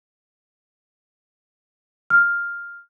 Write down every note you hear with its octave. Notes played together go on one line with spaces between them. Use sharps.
F6